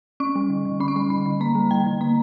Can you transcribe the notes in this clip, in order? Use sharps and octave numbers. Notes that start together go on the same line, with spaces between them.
C#4 C#6
G3
D3
D3
C#4 B5
C#6
G3 B5
D3 B5
D3
A#3 A#5
G3
D3 G5
D3
A#3 A#5